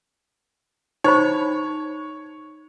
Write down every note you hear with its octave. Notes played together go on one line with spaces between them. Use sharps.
D#4 C5 C#5 B5